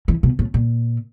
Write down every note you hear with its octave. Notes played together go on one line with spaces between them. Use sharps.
E3
B2
A2
A#2